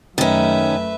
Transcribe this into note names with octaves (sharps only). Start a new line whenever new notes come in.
F#2 D#3 A3 C#4 B4 E5